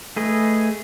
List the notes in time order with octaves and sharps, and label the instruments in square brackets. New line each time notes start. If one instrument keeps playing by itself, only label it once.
[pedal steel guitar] A3 G#4 B4 D#5